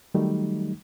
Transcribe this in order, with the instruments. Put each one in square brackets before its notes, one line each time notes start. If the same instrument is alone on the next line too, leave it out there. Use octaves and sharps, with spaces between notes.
[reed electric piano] D#3 F#3 G3 A3 D#4